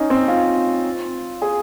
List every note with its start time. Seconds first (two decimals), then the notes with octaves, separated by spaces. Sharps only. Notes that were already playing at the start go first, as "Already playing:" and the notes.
Already playing: C#4 D#4
0.10 C4
0.28 F4
1.42 G#4